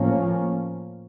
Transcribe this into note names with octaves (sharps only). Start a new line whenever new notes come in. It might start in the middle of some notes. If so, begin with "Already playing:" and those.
Already playing: A2 F3 A#3 C#4